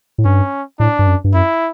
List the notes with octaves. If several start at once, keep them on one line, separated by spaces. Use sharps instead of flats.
A2
G2 C#4
A2 D4
G2
F#2
G2
F#2 E4